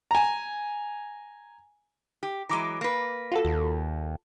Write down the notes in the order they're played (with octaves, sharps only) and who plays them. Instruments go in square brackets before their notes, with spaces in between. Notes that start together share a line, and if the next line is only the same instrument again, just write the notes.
[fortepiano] G#5 A#5
[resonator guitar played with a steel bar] G4
[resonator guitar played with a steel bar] E3 F#3 G#3 [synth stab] A#5 D6
[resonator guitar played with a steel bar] A#3 B4
[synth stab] F4 F#4 A4
[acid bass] D#2